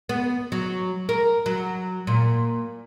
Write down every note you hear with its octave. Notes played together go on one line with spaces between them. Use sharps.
B3
F#3
A#4
F#3
A#2